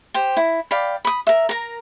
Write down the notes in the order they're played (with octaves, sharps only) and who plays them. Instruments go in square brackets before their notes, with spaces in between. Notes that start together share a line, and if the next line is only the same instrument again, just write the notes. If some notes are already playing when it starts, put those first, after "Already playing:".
[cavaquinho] G4 C5
E4
D5 F5 G5 B5
B5 D#6
A#4 E5
A#4 A#5